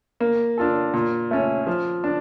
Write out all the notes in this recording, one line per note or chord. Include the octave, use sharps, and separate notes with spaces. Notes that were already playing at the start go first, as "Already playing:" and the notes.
A#3
D4 F4 A4
A#2
A3 C#4
F3
D4